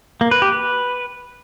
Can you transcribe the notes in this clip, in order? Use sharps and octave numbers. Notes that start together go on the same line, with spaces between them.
A#3
B4
G4
B4